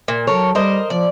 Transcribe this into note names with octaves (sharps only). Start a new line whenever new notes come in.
A#2
F#3 A4 A#4 C#5
G3 A#4 C5 D#5
F3 D5